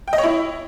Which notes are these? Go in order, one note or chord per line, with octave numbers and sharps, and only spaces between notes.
G5
D#5
C#5
E4